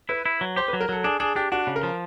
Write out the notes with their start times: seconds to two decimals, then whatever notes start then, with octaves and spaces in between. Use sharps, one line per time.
0.09 E4 B4
0.26 E4
0.41 F#3
0.56 G4 C5
0.68 B4
0.73 F#3
0.80 A#4
0.89 F#3 A4
1.04 D4 G#4
1.20 D4 G#4
1.36 D4 G4
1.52 D4 F#4
1.67 C#3
1.76 A#4
1.83 F3